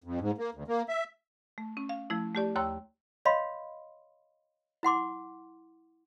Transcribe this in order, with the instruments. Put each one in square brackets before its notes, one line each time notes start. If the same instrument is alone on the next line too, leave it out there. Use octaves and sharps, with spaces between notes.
[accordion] F2
G#2
A#3
D2
A#3
E5
[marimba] A3
C#4
F5
F3 A3 E4
A3 G4 D5
D#2 C#5 G5 A#5 C6 E6
[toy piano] C#5 D#5 F5 B5 C6
E4 F#5 C6 D6